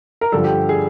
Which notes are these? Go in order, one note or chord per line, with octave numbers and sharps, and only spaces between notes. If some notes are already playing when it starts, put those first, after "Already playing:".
A#4
G2 D3 F3 A4
G4
G#4